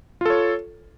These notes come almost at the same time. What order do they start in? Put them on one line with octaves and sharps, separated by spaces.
F4 A4 C#5